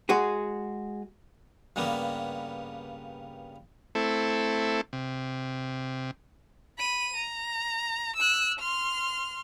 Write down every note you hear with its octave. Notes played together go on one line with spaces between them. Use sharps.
G#3 F#4 G#4
G2 C#3 G3 A#3 B3
A3 C4 E4 A4
C3
B5 D#7
A#5
E6 F#6
C6 F6